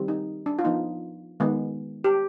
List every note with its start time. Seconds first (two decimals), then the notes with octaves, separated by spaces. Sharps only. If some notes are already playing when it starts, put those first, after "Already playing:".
Already playing: D#3 G3 C4
0.08 D#4
0.46 D4
0.59 F4
0.64 F3 B3 D#4
1.40 D#3 G#3 B3
2.04 G4